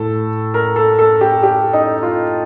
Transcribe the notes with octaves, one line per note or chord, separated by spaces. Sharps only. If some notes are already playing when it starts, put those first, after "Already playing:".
Already playing: A2 A4
A#4
A4
A4
G4
G4
D#4
F4